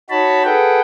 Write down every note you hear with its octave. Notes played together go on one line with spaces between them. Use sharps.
D#4 F#4 C#5 A5 B5
G#4 A4 B4 F#5 G5